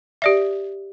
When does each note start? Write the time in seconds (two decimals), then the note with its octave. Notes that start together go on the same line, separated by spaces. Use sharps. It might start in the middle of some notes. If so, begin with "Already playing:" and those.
0.22 G4 D5 E5